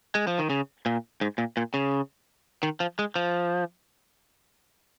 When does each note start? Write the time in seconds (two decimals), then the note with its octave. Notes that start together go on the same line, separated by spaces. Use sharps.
0.15 G#3
0.27 F3
0.39 D#3
0.50 C#3
0.86 A#2
1.21 G#2
1.38 A#2
1.57 A#2
1.74 C#3
2.63 D#3
2.80 F3
2.99 G#3
3.16 F3